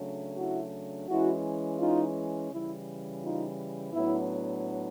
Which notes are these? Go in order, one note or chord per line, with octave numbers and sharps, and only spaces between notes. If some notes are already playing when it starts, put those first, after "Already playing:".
Already playing: C#3 F#3 A3 D4
E4 F#4
E3 G#3 C#4 E4 F#4
D#4 F4
C#3 E3 G3 E4
D#4 F4
A2 F#3 B3 D4 E4